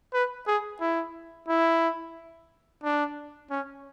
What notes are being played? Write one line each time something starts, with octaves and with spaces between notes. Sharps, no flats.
B4
G#4
E4
E4
D4
C#4